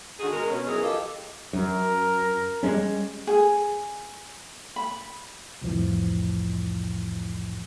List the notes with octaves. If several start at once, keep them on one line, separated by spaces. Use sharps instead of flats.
D3 D#3 F#4 G#4
B2 G#3 A#4
B2 C#4
E3 F#3 D#4 G#4 A#4
F4 G4 A4 D#5
F#2 A#4
G3 G#3 C#4
G#4
B5
C2 F2 A2 E3 F3